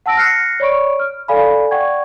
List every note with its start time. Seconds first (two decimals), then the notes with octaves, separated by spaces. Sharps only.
0.06 F#5 A5 E6 A#6 D7
0.17 F6 F#6 A#6 C7 C#7
0.60 C#5 D5 B5 C#6 D7
1.00 F6
1.28 A4 D5 F5 G#5 B5
1.71 D5 F#5 G5 C#6 G#6